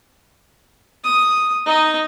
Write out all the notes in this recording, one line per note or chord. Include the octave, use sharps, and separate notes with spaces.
D#6
D#4 D#5